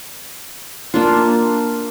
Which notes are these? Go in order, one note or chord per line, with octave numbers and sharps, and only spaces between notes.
A#3 D4 F4